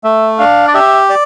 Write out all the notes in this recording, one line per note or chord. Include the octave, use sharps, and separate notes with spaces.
A3 E5
D4 F5
D5
G4 E5
D5